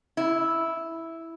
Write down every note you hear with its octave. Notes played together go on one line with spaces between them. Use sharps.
E4